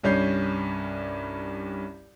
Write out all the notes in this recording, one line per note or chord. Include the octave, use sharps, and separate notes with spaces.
C2 G2 C#4 G6 C7